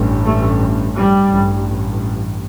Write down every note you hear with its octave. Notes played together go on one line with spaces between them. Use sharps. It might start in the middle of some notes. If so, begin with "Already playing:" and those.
Already playing: A1 G2
A3
G3
A1 G2